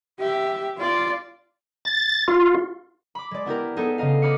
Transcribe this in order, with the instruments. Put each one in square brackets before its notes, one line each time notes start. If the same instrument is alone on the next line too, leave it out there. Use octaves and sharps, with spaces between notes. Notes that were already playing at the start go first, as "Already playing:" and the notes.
[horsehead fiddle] G4 E5
F4 D5
[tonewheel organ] A6
F4
[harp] B5 D6
G#3 D5
B3 E4 G4 A#4
B3 D#4 G#4 A4
C#3 D#4 D#5 F5
D#5 B5 D6 F6 C#7